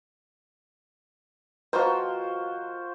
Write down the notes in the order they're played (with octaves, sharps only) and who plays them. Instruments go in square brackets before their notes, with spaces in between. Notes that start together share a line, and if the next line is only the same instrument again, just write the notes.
[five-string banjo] D#3 F3 A#3 [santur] F4 F#4 C5 [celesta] B4